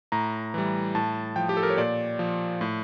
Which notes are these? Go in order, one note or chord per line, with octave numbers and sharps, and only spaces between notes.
A2 A#5
E3 G3
A2 A5
F3 G5
G4
A4
A#4
C#5
A#2 D5
F3
A2